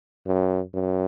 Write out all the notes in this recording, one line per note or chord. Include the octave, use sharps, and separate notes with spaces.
F#2
F#2